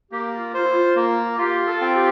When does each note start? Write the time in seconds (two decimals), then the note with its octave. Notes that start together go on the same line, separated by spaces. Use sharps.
0.12 A#3 G4
0.34 F4
0.54 F4 C5
0.63 E4
0.73 F4
0.96 A#3
1.38 F4 G4
1.67 A4
1.81 C4
1.95 G4